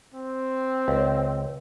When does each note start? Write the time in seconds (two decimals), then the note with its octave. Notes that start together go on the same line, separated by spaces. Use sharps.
0.14 C4
0.88 C#2